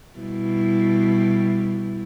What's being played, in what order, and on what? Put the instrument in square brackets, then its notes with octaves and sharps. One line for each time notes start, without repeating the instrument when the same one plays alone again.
[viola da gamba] B2 G3 E4